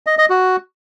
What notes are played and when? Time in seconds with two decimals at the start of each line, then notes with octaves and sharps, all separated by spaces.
0.07 D#5
0.18 D#5
0.30 F#4